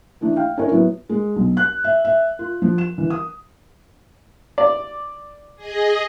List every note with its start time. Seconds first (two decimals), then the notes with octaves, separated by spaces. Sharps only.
0.21 E3 A3 D4 D#4
0.37 F5 G5
0.57 C#4 D4 A#4 C#5
0.70 A2 F#3 B3
1.09 G#3
1.36 B1
1.57 F#6
1.84 E5
2.05 E5
2.39 F4
2.62 F3
2.78 E7
2.98 E3
3.10 D#6
4.58 D5
5.56 G#4 D#5